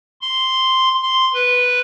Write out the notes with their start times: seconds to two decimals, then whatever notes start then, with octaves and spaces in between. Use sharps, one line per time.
0.21 C6
1.02 C6
1.34 B4